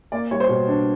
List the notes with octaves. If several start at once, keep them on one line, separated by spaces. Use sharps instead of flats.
A#3 D5
G3 C#5
C5
B2
D4